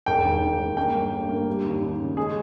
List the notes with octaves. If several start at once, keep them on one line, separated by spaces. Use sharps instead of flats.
E1 G5
D#2
D#2
E1
A#3 G5
G1
G2
A#3
G3
D#2
D#2
C#3
G#3 G#4